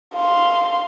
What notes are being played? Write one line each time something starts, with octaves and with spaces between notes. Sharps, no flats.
F5 C6